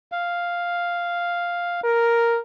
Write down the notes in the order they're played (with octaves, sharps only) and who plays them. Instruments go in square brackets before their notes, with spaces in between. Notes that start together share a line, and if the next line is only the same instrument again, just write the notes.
[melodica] F5
[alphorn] A#4